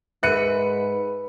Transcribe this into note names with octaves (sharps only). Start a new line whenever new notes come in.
G#2 A#4 B4 E5 F#6 C#7 D#7